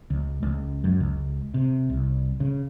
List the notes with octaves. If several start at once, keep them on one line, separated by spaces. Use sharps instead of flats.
C#2
C#2
F#2
C#2
C3
C2
C#3